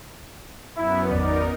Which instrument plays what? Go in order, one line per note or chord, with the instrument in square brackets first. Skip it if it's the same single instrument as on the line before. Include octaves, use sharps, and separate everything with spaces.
[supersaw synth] F#2 B3 [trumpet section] E4
[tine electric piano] G#1 E2 [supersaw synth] D#4 A#4 [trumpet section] D5